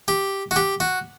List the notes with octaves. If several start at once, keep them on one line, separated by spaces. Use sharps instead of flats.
G4
F#4
G4
F#4